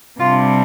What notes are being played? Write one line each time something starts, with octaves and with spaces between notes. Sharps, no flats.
C3 G3 D4 F4